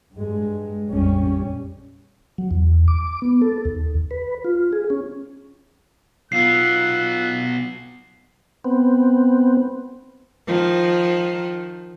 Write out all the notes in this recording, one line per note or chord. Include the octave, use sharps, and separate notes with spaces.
G2 G#3
A#1 F2 G3 C#4
F#3
E2
D6
B3
A4
D#2
B4
F4
G#4
C#4
B1 B3 F4 F5 E6 F#6 C7
B3 C4
D#3 F3